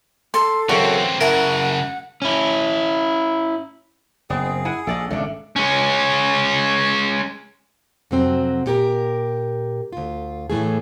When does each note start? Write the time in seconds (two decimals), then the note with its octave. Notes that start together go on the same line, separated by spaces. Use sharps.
0.34 A4 C6
0.69 F#2 C#3 E3 C4 F#4
1.21 F#2 C#3 E4 A#4 F#5 A5
2.22 C#4 E4
4.30 F#1 B3 C4 G#4
4.65 E4 F#5 G#5
4.87 A#1 A4 D5 D#5
5.10 G#1 C#2 B2 A3 D4
5.56 G#3 C#4
8.11 F2 C3 F#3 C4 F#4
8.66 A#2 G4 A#4
9.93 D2 F4
10.50 A2 E3 A3 G#4